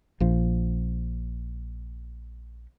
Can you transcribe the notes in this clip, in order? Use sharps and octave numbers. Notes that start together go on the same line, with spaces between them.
A#1 F3